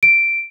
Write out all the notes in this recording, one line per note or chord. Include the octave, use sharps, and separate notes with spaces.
D7